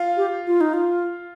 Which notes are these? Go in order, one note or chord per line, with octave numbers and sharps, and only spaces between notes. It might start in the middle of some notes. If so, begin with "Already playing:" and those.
Already playing: F4 F5
G4
F4
D#4
F4